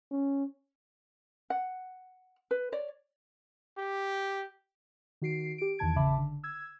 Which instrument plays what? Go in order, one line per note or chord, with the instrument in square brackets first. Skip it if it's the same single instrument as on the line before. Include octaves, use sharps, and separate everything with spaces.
[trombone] C#4
[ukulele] F#5
B4
C#5 D5
[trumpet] G4
[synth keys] D#3 F#4 C7 D7
G4 D7
E2 D#3 E3 A5 G#6 D7
G#1 C#3 E5 A5 B5 D6
D3
E6 G#6